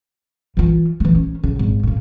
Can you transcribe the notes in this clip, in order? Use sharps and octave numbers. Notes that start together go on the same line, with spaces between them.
E3 F4
E3 A3
C#4
C#3
G#1
A2 A#3